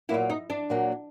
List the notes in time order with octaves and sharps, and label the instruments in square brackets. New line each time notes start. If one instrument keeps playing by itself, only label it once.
[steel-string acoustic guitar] A#2 F#3 A#3 [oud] E4
[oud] D#4
D4
[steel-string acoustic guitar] A#2 F#3 A#3